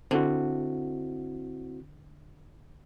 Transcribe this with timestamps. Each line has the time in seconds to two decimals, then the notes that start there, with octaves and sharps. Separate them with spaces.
0.11 D3 C4 E4 F#4